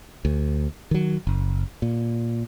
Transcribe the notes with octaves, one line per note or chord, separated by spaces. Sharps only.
D2
D#3 F#3
F#1
A#2